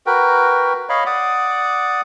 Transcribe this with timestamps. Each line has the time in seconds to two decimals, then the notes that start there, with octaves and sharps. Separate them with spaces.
0.06 F#4 A#4 B4 G5
0.89 C#5 D#5 F5 B5
1.06 D5 F#5 D6 D#6